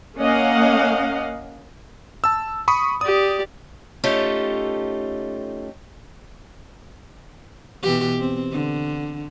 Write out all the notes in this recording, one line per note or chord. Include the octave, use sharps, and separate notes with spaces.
A#3 C#4 D#5 F5 F#5
A5 E6
B5 C#6 D#6
G4 D5 D#6
A3 C#4 D#4 F4 G4 A4
B2 E3 G4
C4
D3